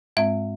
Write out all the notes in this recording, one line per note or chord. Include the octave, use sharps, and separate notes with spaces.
G#2 G#3 C4 E5